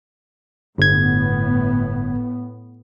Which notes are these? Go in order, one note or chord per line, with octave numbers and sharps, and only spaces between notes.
G1 A2 B3 G#6